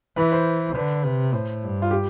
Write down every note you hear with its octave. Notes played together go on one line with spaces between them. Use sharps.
E3 B4
C5
D3 B4
C3 B4
A2 C5
G2
F4
G4